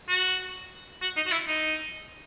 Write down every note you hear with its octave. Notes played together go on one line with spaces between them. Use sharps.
F#4
F#4
D#4
F#4
E4
D#4